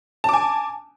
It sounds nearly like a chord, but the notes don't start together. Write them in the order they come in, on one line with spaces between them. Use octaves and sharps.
A5 D6 G#5